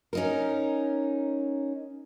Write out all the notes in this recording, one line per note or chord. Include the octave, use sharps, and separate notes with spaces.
C#4 D#4 A#4